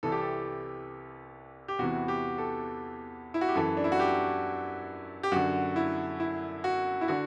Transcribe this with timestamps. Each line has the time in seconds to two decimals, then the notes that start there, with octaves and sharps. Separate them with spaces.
0.03 C2 C3 E3 A4
0.12 G4
0.21 A4
1.68 G4
1.79 E2 C3 E3 F#4
2.08 G4
2.38 A4
3.34 E4
3.41 F#4
3.48 G4
3.55 F#2 E3 A4
3.77 D4
3.84 E4
3.92 F#4
3.99 G4
5.23 G4
5.32 F#2 D3 F#4
5.76 E4
6.20 E4
6.64 F#4
7.01 E4
7.08 D3 F#4